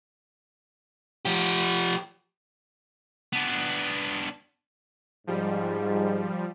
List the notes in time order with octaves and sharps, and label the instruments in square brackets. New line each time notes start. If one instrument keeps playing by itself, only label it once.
[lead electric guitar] F3 G4
[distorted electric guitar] B3 D4
[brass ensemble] G#2 [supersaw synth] F3 G3